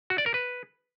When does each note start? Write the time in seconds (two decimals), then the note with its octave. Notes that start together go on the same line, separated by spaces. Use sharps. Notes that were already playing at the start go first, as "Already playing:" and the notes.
0.10 F#4
0.18 D5
0.26 A#4
0.34 B4